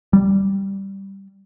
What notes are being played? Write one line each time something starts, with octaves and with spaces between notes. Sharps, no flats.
G3